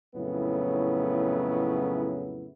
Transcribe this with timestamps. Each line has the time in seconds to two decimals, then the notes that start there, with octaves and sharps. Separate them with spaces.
0.15 F2 A2 C#3 F#3 B3 E4